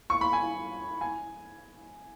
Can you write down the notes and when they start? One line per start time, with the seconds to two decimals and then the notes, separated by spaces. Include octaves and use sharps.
0.10 C#6
0.21 B5
0.33 G#5
1.01 G#5